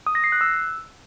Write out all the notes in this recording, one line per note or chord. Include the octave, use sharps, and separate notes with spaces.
D#6
A#6
C7
F#6
E6